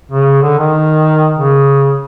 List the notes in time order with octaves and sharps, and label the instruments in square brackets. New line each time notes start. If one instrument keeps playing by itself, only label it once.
[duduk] C#3
D3
D#3
C#3